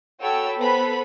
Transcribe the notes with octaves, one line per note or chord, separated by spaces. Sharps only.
F#4 A4 C#5 G5 B5 E6
B3 A4 B4 C5 B5